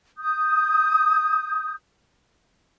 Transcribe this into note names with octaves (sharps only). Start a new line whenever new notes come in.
D#6 G6